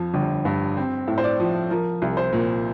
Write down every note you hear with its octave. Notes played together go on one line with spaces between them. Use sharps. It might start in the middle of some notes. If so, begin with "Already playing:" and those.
Already playing: F2 F3
G1
G2
C4
A2
C5
D5
F3
F3 A#4
C2
C5
A#2